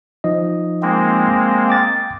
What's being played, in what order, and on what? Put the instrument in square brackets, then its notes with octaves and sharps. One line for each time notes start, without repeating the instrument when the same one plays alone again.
[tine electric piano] F3 D#4 D#5
[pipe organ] G#3 A#3 C4
[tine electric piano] G5 D6 A6